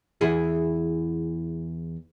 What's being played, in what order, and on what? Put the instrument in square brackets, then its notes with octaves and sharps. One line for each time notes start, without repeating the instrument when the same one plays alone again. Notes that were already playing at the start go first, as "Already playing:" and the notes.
[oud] E2 E4 G#4